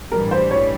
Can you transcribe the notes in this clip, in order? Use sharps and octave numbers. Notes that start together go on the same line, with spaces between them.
A1 G2 E3 G3 A#4
C5
C#5